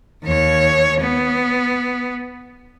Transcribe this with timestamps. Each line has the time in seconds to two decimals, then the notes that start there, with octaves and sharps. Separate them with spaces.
0.24 D#2 C#5
1.01 B3